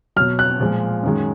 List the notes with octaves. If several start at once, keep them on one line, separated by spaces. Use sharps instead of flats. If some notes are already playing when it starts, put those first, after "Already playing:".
B2 F#3 F6
F#6
A#2 F3 G#3
F#2 D#3 G#3